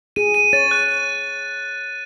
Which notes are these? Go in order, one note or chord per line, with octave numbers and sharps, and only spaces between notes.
G#4 D#7
D#7
C#5 A6
F#6